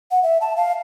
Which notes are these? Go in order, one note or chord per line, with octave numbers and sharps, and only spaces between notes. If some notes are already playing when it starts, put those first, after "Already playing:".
F#5
E5
A5
F5